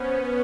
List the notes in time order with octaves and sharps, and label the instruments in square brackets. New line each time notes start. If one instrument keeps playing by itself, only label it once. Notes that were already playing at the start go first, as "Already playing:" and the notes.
Already playing: [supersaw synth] B3 C#4 [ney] C5
[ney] B4